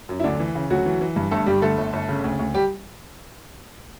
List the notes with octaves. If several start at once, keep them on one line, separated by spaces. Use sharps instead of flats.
F#2
E4
D2 D3 D4
E3
C#3
D2 F#3 F#4
E3
E3
G2
G1 A3 A4
G2 G3 G4
D3 A3 A4
G1
G1
C#3
D2
D2
G3 G4